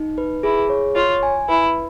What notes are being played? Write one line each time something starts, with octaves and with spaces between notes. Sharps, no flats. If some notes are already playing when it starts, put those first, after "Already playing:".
Already playing: D#4
B4
E4 G#4
C#5
F4 C#5
G#5
E4 B4